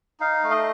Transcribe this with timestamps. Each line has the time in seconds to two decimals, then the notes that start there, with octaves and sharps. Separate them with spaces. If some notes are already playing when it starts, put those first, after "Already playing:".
0.20 D#4 F5
0.43 A3
0.50 D#5